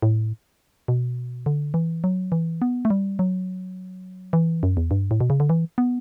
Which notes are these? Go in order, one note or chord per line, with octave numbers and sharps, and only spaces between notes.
A2
B2
D3
E3
F#3
E3
B3
A3
G3
F#3
E3
F#2
E2
G2
A2
B2
C#3
D3
E3
B3